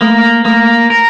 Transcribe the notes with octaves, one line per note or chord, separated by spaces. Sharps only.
A3 A#3
A3 A#3
A#4